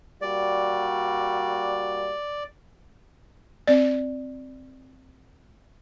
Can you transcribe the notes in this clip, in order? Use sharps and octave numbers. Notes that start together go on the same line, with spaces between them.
G3 A#3 F#4 D5
C4 D5